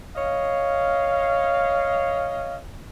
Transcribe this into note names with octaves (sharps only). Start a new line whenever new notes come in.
C#5 D#5 F5